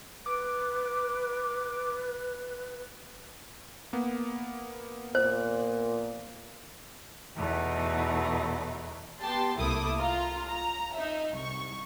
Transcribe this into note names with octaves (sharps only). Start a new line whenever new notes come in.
B4 D6
A#3 B3
A#2 C5
E2 B2 E3 A3 D#4
B3 G4 G5 A5 C6
C2 A3 A#3 E4 D6 D#6
F4 A#5
A#5
D#4 E5
C2 C#6